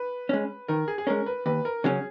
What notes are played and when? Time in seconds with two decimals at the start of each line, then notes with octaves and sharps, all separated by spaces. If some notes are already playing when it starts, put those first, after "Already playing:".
Already playing: B4
0.29 G#3 C#4
0.68 D#3 A#4
0.88 G#4
0.98 G#4
1.07 G#3 C#4 A#4
1.26 B4
1.46 D#2 B4
1.65 A#4
1.84 C#3 F#3 C#4 G#4